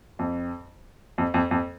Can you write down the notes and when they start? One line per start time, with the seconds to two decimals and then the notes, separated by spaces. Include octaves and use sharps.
0.19 F2
1.18 F2
1.34 F2
1.51 F2